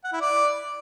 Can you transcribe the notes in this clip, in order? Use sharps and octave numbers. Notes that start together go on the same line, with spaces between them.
F#5
E4
D5